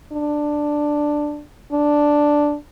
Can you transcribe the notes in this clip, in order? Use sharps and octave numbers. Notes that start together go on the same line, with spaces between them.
D4
D4